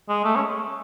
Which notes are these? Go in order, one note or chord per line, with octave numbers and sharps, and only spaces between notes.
G#3
A3
C#4